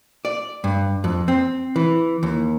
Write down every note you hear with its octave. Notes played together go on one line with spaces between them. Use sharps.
D5
G2
F2
C4
E3
D#2